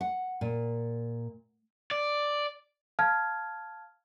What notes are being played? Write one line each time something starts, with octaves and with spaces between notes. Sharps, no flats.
F#5
A#2
D5
F5 A5 F6 G#6